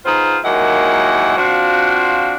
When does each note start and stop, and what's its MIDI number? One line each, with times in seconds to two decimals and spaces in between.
0.06 0.38 59
0.06 0.38 63
0.06 0.38 65
0.06 0.38 68
0.06 0.38 72
0.44 1.35 39
0.44 1.35 54
0.44 1.35 56
0.44 1.35 58
0.44 1.35 64
0.44 1.35 78
1.38 2.36 53
1.38 2.36 60
1.38 2.36 62
1.38 2.36 65
1.38 2.36 66